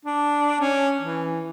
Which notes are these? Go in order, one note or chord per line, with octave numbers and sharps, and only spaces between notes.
D4
C#4
E3